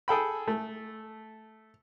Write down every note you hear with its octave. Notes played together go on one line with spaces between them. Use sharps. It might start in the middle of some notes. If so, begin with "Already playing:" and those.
G#4 A4 G5 B5
A3